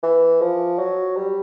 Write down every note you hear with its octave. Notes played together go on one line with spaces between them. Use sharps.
E3
F3
F#3
G3